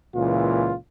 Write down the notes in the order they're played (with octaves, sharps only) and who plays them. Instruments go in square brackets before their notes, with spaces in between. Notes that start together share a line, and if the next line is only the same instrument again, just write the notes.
[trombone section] C#2 A#2 E3 F4